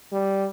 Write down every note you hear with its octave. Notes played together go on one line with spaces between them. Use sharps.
G3